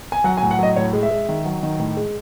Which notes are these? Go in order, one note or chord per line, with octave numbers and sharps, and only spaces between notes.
G#5
F#3 F#5
G#5
A2
F#5
F#3 D#5
A2 C#5
G#3
E5
G#3
D#3
F#3
D#3
A2
G#3